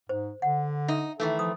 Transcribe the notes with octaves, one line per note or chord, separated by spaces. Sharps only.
G#2 C5
D3 F#5
D#4 E5
D#3 E3 A3 A4
F3 D#6